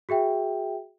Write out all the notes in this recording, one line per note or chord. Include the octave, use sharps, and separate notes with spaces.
F#4 G#4 E5 G5